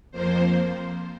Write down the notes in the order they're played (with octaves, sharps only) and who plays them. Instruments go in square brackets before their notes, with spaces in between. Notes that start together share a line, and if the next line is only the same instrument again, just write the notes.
[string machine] F2 F3 A#3 C5